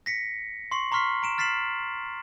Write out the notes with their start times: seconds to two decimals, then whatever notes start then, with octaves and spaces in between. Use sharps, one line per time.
0.06 A#6 B6 C#7
0.71 C6 C#6 C7 F#7
0.92 A#5 C6 C#6 F6 B6 C7
1.23 A#5 D7 E7
1.38 F6 A6 B6 C7 E7 F#7